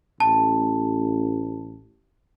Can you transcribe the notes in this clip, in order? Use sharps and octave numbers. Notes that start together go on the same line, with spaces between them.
A1 A5